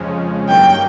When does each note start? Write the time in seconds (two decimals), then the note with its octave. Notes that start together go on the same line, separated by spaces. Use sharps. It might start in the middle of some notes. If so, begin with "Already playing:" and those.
Already playing: F2 C#3 F3 G#3 C#4
0.49 G2 D#3 F#3 A#3 C#4 G5